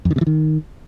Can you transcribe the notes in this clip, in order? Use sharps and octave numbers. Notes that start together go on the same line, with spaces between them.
F2
D#3
C3
E3
D#3